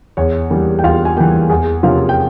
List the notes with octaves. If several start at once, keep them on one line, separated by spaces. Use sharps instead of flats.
E2 C#5
E3 G3 A#3
G5
E2 F4 F5
G#5
E3 G3 A#3 G4 G5
E2 G#4 G#5
C3 F3 A#3 C#4 F4 F5
G5